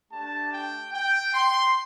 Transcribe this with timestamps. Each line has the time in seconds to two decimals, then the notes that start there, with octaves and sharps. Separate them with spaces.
0.11 A3 D4 G4 A5
0.51 G5
0.93 G5
1.34 C6